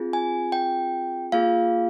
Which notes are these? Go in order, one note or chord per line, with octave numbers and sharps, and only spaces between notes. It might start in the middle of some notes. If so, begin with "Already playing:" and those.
Already playing: C4 F4 G#4
G#5
G5
A#3 F4 G#4 F5